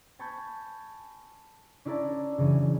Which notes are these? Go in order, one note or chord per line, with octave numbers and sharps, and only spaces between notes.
G#5 A5 B5 C#6 G6 G#6
C#4 D4 E4 A#4 D5 A5
F#1 C#3 E3 D#7